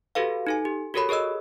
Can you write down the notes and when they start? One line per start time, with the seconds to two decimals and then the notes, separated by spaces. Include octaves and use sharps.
0.15 F#4 G4 A4 B4 F5
0.47 D#4 A4 G#5
0.65 G4
0.94 F#4 G4 A4 A#4 C#5 B5
1.09 G#4 A#4 C#5 D#5 E6